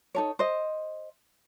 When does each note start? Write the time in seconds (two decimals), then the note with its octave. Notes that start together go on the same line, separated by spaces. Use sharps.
0.15 D#4 A4 C#5
0.39 C5 D#5